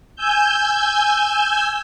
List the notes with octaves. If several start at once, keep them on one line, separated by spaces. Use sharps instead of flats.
G#5 E6 G6